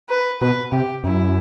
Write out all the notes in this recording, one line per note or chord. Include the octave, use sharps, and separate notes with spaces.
B4
B2 B4
C3 G4
F#2 E4